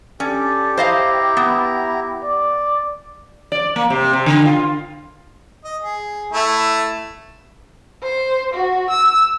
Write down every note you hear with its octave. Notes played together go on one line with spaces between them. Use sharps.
C#4 G4 A4 D5
E4 C5 D#5 F5 A#5
B3
D5
D5
A#3
C3
C3
D3
F4
D#5
G#4
A3 E4
C5
F#4
E6